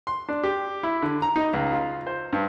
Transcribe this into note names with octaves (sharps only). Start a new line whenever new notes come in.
C6
D4
G4
E4
D3
A#5
D#4
C#2
F4
C5
G2